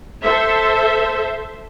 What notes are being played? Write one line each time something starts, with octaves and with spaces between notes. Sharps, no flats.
A4 C5 E5